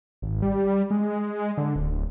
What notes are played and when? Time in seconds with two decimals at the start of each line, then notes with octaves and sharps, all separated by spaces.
0.22 G#1
0.42 G3
0.91 G#3
1.57 D3
1.76 D1